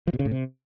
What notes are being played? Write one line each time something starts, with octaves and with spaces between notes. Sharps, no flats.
F3
B2
C#3
A2
C3